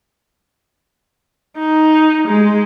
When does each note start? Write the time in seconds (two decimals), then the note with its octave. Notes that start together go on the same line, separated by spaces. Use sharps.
1.58 D#4
2.28 G#3